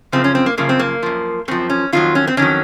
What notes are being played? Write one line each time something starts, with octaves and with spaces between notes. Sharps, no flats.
F#2 C#3 F3 C4
C#4
C4
A#3
F#2 C#3 F3 A#3
C4
A#3
F#2 F3
F#2 F3 C4
C#4
F2 D#3 F#3 F4
C#4
C4
F2 D#3 F#3 C#4